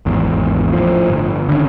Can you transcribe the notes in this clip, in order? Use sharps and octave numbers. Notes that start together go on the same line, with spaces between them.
G#1 E2
A2 F3
G1
D3 D#3 G#3 C#4